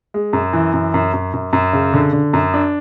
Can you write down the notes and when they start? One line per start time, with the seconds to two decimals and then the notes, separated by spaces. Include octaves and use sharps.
0.14 G#3
0.33 F#2
0.53 E3
0.73 F#2
0.94 F#2
1.14 F#2
1.33 F#2
1.53 F#2
1.73 C#3
1.94 D3
2.13 D3
2.33 F#2
2.54 D4